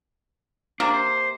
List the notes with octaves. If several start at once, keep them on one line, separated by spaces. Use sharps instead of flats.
C3 A#3 D4
C5